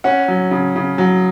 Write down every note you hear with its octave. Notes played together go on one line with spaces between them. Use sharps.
C#4 F#5
F#3
C#3
C#3
F#3